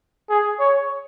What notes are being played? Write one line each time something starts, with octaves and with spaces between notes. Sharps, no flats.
G#4
C#5